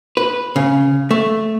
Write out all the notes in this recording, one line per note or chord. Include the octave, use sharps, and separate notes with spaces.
B4
C#3
A3